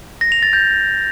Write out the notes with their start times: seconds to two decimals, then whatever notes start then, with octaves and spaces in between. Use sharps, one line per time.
0.21 A#6
0.32 F7
0.43 A6
0.53 G6